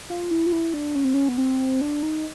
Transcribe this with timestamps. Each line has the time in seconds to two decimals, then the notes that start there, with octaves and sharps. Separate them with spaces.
0.10 F4
0.31 E4
0.46 F4
0.52 E4
0.74 D4
0.95 C#4
1.04 C4
1.14 C#4
1.29 B3
1.38 C4
1.81 D4
2.03 D#4